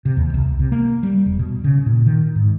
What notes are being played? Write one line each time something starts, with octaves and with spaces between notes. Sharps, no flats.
C3
D#2
C2
C3
A#3
G3
E1
B2
C#3
A#2
D#3
G#2